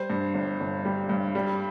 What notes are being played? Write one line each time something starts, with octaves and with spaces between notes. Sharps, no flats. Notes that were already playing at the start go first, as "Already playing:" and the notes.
Already playing: G3 C5
G2
G1
G1
G3
G2
G3